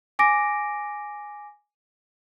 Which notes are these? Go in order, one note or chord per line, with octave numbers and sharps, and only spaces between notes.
G#5 D6 A#6 D7